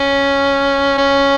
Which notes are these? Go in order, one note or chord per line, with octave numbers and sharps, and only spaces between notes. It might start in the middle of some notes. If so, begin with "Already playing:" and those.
Already playing: C#4
C#4